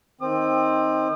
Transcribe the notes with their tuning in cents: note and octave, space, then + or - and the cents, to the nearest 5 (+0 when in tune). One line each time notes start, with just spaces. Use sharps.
D#3 +15 C4 +10 D#6 -45